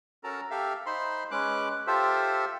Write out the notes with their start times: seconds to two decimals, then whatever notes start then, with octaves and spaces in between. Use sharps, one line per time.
0.24 C#4 F#4 A4 A#4 A5 A#5
0.51 G4 A4 E5 F5
0.86 D#4 C5 B5 C6
1.31 G#3 C#4 B4 D6 F#6
1.87 F4 G4 A4 C5 E5